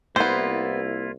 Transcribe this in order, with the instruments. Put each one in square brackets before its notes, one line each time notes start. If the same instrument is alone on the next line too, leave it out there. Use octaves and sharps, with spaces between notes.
[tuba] C2 [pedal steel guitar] A#3 E4 F4 [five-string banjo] B3 C5